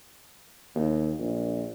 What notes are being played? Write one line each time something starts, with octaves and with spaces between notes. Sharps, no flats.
D#2
A#1